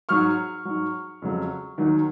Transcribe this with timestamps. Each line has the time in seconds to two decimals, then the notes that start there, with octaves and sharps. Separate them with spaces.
0.09 G#2 F#3 C#6 F6
0.65 G#2 F#3
1.22 F2 C#3 F#3
1.78 D#2 D#3 F#3